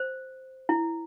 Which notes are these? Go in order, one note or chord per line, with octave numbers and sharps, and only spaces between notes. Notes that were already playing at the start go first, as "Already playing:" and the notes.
Already playing: C5
E4